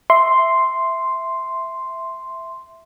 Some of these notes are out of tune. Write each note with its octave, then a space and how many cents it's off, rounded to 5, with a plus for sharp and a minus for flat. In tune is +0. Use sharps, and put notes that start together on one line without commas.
E5 +0 C6 +0